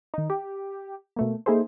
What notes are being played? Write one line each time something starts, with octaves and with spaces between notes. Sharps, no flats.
D#3 D#4
G4
B2 A3 A#3
A#3 D#4 E4 G#4 A4 C5